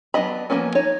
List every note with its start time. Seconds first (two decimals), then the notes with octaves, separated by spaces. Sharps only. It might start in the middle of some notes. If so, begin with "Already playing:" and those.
0.14 F#3 B3 D4 D#5 B5
0.50 F3 G#3 A#3 B3 C#4
0.75 D#4 C#5